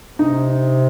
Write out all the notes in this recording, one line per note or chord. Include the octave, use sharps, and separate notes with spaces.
C3 D#4